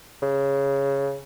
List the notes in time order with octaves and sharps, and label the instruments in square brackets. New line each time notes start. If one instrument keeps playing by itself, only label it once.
[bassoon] C#3